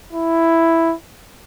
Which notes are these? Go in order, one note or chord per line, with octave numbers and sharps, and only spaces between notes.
E4